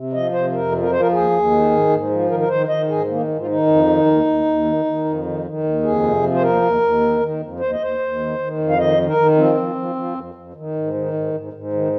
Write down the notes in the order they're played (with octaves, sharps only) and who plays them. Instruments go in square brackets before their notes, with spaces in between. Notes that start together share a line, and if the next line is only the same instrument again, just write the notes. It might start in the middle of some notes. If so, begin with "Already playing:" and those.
Already playing: [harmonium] C3
F3 D#5
C3 C5
F2 A#4
F3
A#4
F3 C5
A#4
D#2 G#4
D#2
D#3
G#2
G#2
F3
D#3 A#4
A#4
D#3 C5
D#3 D#5
G#2 G#4
D#3 A#3
G#2
F4
D#3 D#4
F2
D#3
D#2
D#2
D#2
D#3
D#3
F2
D#3
D#3
D#2
F2 G#4
C3
F3
C5
D#2 A#4
D#2
D#2
D#3
D#3
F2
D#2 C5
D#5
D#2 C5
D#2
D#3
D#3
F2
F5
D#3 D#5
D#3
A#4
D#3
F3 C4
F3
F3
F3
F2
F2
D#3
G#2
D#3
G#2
G#2
G#2
D#3